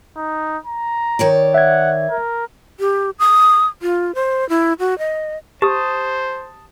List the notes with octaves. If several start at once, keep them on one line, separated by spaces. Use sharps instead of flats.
D#4
A#5
D#3 C#5 D5
E5 F#5 G#6
A#4
G4
D#6
F4
C5
E4
F#4
D#5
G4 C5 A5 D#6